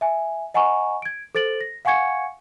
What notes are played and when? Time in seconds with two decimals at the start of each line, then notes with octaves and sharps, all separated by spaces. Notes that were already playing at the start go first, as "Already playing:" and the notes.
0.01 E5 G#5
0.54 D#5 F#5 G#5 A#5 C#6
1.02 G#6 D7
1.35 A4 C5 A6 D7 F#7
1.61 A#6
1.85 F5 F#5 G#5 C#6 G#6 C#7